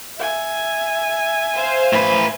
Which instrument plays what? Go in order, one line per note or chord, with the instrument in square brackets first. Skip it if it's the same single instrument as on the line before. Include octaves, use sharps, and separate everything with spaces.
[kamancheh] E5 G#5
[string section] C5 F5
[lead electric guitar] A2 B4